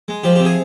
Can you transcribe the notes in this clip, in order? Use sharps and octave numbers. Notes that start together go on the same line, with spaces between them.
G#3
F3 G4
C3 G4
G#4